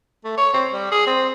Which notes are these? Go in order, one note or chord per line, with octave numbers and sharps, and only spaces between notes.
A3
C#5
C4
G3
G#4
C4